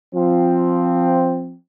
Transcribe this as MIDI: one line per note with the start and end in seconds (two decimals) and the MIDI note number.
0.14 1.54 53
0.14 1.54 60